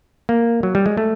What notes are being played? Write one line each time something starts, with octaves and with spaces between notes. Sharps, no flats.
A#3
F#3
G3
G#3
A3